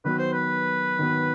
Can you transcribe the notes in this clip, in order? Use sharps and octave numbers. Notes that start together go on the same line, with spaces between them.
D#3 F#3 B3 B4
C5
B4
D#3 F#3 B3